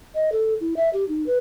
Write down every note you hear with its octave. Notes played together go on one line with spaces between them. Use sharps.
D#5
A4
E4
E5
G4
D#4
B4